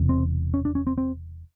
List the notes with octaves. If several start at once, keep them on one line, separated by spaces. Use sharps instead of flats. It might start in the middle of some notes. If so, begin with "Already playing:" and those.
Already playing: E1 E2 C3
C4
C#4
D4
C#4
C4
C4